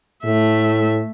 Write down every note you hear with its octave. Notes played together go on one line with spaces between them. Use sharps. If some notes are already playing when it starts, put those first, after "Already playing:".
A2 A3 E5